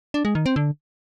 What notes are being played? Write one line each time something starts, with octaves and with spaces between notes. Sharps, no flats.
D4
G#3
D#3
C4
D3